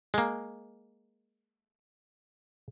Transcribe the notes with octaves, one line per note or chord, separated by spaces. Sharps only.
G#3 A#3